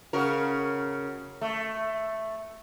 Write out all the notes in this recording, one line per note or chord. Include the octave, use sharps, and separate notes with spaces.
C#3 F#4 A#4
A3